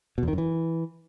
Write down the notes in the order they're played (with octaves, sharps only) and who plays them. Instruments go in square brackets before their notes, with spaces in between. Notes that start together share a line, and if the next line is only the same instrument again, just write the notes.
[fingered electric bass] B2
E2
D#3
F#2
E3